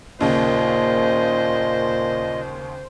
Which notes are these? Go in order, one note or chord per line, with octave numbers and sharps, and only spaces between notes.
D#2 A#2 C#3 C5 D#5